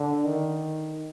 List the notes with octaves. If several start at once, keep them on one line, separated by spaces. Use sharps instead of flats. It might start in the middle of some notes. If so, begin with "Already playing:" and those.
Already playing: D3
D#3